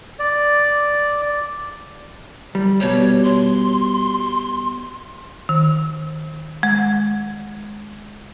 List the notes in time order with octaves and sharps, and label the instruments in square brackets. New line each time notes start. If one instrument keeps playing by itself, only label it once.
[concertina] D5
[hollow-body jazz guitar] G3
[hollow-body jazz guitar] B2 G3 [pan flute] C#5
[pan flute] C6
[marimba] D#3
G#3